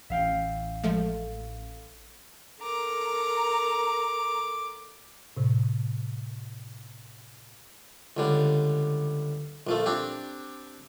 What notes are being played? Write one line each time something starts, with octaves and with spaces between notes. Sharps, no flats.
A1 E5 F5 G5
F3 G#3 A3 A4
A4 A#4 A#5 D6
A2 C3
C#2 D3 G3
A#1 F3 A3
C4 D4 G4